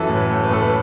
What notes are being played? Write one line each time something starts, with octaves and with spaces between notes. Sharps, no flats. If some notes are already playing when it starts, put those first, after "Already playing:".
Already playing: F#2 E3 A4
A2
B4
A3
B4
A2 A4
B4